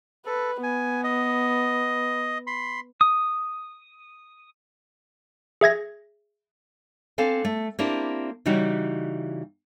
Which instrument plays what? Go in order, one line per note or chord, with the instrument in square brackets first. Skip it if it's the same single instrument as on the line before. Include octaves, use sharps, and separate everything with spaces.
[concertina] A4 [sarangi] B4
[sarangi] B3 [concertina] G#5
[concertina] D#5
B5 C6
[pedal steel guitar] D#6
[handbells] G#4 E5 G#6 A#6
[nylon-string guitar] C4 D4 A4 F5 G#5
A3
A#3 C4 D4 E4 G4 A#4
C#3 E3 G3 D#4 F#4 G4